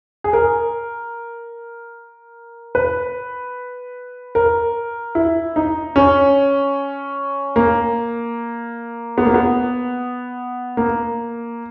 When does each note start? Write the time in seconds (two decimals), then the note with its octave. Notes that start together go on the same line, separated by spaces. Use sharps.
0.24 G#4
0.33 A#4
2.75 B4
4.35 A#4
5.15 E4
5.56 D#4
5.96 C#4
7.56 A#3
9.18 B3
9.25 A#3
9.34 B3
10.77 A#3